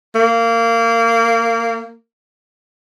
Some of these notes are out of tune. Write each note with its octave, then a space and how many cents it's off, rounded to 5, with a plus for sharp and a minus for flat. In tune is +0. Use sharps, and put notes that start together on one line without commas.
A#3 -20